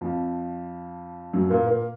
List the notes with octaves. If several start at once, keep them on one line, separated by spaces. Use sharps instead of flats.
F2 F3
F#2 F#3
A#2 A#3
A#2 A#3